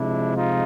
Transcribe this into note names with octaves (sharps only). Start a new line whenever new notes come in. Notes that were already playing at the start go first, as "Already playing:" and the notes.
Already playing: C3 F3 G#3 D4 E4
D#4 F4